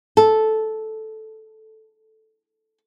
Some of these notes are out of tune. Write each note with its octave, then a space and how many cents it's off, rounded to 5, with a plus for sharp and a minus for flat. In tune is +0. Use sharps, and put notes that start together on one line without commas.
A4 -10